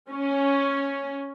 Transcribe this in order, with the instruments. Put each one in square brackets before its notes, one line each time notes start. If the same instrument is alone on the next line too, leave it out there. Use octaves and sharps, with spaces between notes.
[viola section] C#4